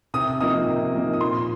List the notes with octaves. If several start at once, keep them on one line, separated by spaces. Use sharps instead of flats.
C3 D#6
F3 A#3 D#4 D#6
C3
F3 A#3 D#4
D#6
A#2 C6